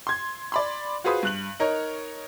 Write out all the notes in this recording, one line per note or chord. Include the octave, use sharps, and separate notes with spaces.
C6 G#6
D5 B5 C6
F4 F#4 G#4 B4 C5 D#6
G2 F#6 F#7
D#4 A#4 C#5